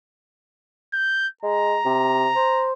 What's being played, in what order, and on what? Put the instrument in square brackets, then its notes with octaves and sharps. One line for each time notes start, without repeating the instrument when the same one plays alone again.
[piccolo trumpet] G6
[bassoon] G#3 [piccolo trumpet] A#5
[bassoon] C3
C5